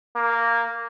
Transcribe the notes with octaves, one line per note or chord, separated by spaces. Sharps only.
A#3